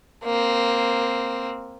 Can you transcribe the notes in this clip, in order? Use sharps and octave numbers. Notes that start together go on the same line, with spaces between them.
A#3 C4